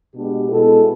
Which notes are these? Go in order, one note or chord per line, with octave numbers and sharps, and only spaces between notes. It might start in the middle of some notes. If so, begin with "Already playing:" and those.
B2 G#3 B3 D4 G4
B2 G#3 B3 E4 A4